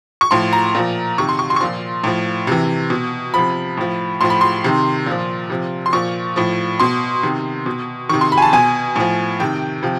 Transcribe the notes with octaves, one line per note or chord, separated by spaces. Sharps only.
C#6
A2 F3 C6
A#5
A#2 F3
C3 D#3 C#6
C6
C#6
C6
C#6
A#2 F3 C6
A2 F3
C3 E3
B2
C3 F3 B5
A2 F3
A2 F3 C6
B5
C6
C3 D#3
A#2 F3
C3 F3
C6
A#2 F3 C#6
A2 F3
B2 C6
C3 D#3
B2
C3 D#3 C#6
C6
B5
G#5
A5
B2 G#5
A2 F3
C3 D#3 G5
C3 F3